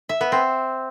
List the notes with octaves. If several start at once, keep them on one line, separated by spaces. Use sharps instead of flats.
E5
B3
C4